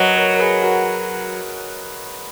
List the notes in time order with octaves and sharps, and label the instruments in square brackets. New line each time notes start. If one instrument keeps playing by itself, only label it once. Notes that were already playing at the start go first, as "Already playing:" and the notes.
Already playing: [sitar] F#3 [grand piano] F#4 A#4 B4 D#5
[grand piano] A#4 C#5
A#4
G#4 B4
F#4 A#4